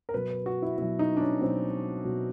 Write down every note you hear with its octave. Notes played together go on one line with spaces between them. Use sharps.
A#4
B2 F#3 B4
B4
F#4
E4
B2 F#3 E4
D#4
D4
C#4
B2 F#3 C4
B2 F#3